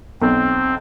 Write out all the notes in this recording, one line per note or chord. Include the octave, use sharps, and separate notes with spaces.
B1 C4